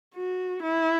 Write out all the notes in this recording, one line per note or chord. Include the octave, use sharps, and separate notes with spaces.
F#4
E4